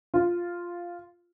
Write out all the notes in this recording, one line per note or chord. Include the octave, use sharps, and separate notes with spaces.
F4